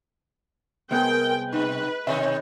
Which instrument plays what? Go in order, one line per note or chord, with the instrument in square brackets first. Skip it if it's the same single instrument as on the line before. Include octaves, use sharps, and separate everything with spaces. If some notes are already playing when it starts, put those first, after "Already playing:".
[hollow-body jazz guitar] C2 B3 G#4 [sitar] G#3 [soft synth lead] A#4 [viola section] G5
[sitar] B2 [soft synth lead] D#4 [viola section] B4
[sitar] B2 D#3 D#4 [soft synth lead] C#5 [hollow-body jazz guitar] E5